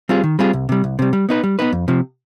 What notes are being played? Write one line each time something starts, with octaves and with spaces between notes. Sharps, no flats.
G3 C4 F4 G#4
D#3
G3 C4 F4 G#4
C2
C3 G3
C2
C3 G3
G3
B3 D#4 B4
G3
B3 D#4 B4
F2
C3 F3